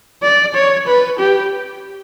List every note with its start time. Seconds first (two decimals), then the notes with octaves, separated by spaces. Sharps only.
0.23 D5
0.55 C#5
0.87 B4
1.19 G4